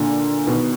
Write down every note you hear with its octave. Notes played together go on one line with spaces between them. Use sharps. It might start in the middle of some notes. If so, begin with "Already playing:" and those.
Already playing: A#2 D3
B2 D#3